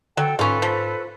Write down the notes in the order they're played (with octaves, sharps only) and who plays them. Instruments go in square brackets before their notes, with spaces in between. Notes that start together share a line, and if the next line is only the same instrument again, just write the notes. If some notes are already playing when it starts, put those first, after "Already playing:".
[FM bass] D3 [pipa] F#3 [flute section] A4 G5
[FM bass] G#2 [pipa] C#4 F4 [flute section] A4 B4
[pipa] F3